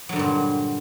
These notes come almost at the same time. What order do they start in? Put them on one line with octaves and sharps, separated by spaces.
F#3 D3 G2 A#2